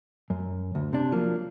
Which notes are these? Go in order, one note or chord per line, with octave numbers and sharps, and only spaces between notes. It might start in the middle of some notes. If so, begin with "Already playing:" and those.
F#2
D2
C3 D4
F3 F#3 A#3